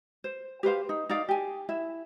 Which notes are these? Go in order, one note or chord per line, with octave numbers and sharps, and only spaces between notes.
C5
G4 B4 C5 F5
D#4
D#4 A#4 D5 F5
G4 G#5
E4 E5